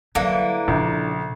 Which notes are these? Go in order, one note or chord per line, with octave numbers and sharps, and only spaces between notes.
D3 E3 F#3 G3 A#3
A#1 A#2 C#3